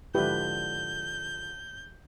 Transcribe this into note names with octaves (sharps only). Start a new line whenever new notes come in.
G#2 D3 F3 E4 G4 B4 G6